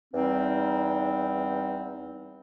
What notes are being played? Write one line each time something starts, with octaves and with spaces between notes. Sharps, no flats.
E2 G3 C4 D#4